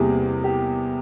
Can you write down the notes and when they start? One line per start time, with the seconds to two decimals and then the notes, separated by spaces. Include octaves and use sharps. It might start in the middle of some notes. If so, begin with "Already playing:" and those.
Already playing: E2 C3 G3 A#3 G#4
0.44 G4